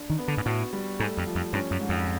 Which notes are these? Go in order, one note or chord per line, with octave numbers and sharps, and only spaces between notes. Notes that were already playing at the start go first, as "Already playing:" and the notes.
Already playing: D4
D#3
B3
D3
G#2
A2 F#4
G3
G#2 A3
F2
F3
F2
G2 C#4
F#2
G#2
F2